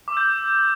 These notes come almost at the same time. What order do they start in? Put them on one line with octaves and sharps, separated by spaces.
D6 E6 G6